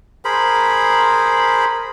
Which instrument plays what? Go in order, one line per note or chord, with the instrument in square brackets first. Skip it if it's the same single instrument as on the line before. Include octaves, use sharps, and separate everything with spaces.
[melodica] G#4 A#4 C5 B5